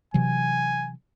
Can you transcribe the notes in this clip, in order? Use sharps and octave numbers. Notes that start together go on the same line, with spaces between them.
C3 E3 F#3 G#5